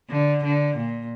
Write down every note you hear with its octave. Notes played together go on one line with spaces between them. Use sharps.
D3
D3
A#2